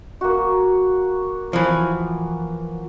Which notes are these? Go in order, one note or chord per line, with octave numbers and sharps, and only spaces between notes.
A#3 F#4
E3 F3